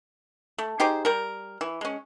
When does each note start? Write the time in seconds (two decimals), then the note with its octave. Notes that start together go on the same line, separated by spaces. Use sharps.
0.58 A3
0.80 D#4 G4 G#4 C5
1.05 G3 A#4
1.61 E3
1.81 G#3 C#4